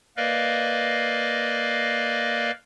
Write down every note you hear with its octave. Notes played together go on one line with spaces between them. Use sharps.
A#3 A#4 B4 D5 D#5 F5